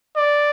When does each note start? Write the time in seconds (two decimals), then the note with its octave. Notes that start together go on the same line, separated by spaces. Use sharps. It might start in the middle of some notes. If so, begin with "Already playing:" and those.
0.16 D5